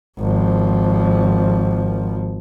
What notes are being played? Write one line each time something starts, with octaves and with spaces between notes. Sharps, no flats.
G#1 F3